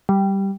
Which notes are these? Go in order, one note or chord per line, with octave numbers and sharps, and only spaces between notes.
G3